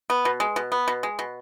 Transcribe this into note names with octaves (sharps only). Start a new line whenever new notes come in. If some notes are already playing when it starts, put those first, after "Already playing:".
B3
B2
G#3
B2
B3
B2
G#3
B2